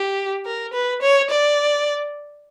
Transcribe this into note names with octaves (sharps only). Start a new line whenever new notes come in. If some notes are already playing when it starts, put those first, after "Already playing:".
Already playing: G4
A#4
B4
C#5
D5